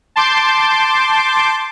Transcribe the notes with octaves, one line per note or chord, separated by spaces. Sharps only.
A5 C6 D6 G6